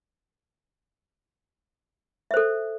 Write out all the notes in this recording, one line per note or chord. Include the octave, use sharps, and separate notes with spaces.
A4 C5 E5